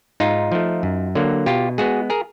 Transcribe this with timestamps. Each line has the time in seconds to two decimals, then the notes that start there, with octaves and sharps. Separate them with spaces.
0.20 G#2 D#4 F4
0.52 F3 A3
0.83 F#2
1.15 D3 F#3 A#3
1.46 B2 F4 G4
1.78 G#3 B3 F#4 G#4
2.10 G#4 A#4